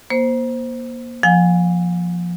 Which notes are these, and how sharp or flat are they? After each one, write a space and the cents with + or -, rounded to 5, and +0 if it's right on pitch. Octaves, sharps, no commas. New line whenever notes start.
A#3 +30 C5 +0
F3 +0 F5 +45 G#5 -25